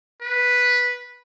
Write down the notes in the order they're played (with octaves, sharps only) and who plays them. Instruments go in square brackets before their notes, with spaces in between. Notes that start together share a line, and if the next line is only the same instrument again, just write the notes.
[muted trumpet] B4